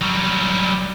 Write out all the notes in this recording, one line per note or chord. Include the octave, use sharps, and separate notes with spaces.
F#3 G3